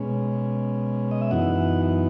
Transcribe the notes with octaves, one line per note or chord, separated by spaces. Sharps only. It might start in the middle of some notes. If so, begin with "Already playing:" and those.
Already playing: B2 G#3 C#4
D#5
E5
F#2 E3 B3 D#4 F#5